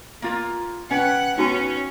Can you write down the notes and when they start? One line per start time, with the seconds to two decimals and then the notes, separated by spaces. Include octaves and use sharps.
0.22 A#3 F4 A#4
0.91 C#4 B4 F#5 G5
1.38 B3 C#4 D#4 F#4 G#5